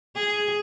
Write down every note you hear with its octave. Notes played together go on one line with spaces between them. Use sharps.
G#4